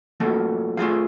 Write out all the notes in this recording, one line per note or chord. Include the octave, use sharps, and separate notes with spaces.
F3 A3 A#3 F#4 A4
A3 F4 G#4 F5